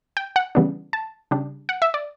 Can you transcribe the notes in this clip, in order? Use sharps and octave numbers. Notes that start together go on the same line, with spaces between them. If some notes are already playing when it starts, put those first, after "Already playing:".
G5
F#5
C#3 E3 G3 B3 D4
A5
C#3 G3 D4
F#5
E5
D5